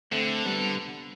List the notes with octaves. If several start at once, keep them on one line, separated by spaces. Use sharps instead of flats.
D3 A3 C4
G3 B3